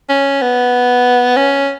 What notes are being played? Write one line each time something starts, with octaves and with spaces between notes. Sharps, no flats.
C#4
B3
C#4